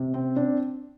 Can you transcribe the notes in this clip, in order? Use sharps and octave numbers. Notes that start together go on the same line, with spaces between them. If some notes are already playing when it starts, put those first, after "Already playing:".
Already playing: C3
C4
D4